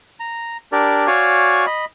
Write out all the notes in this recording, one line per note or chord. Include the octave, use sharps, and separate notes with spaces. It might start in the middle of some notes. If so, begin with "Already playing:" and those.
A#5
D4 G4 A#4 D5
F#4 C#5 D5 F5 G#5
D#5 B5